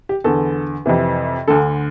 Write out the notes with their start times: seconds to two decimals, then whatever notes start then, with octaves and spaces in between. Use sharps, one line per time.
0.09 G4
0.24 E2 D3 A4
0.86 F2 C3 E3
1.48 D2 D3 A4